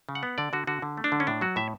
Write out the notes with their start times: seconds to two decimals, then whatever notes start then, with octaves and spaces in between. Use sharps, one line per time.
0.09 C#3
0.15 F#5
0.23 B3
0.38 D3 D5
0.53 D3 F#4
0.67 D3 F#4
0.82 D3
0.97 A3
1.04 D4
1.12 D3
1.20 C#4
1.27 A2 D4
1.41 F#3 F#4
1.56 A2 E5